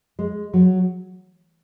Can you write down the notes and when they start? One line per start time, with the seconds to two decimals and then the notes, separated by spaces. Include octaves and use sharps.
0.19 G#3
0.53 F#3